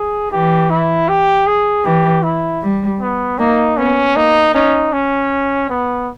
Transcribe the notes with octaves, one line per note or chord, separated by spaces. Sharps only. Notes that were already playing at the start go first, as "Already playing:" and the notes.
Already playing: G#4
E3 G4
E4
G4
G#4
E3 G4
E4
G3
B3
A#3 D#4
B3 C#4
A#3 D#4
C#4 D#4
C#4
B3